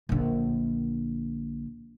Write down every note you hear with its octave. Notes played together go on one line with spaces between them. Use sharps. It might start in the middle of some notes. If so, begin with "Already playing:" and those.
A#1 D3